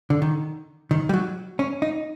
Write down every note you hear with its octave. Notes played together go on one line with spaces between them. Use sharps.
D3
D#3
D#3
G3
F#3
C#4
D#4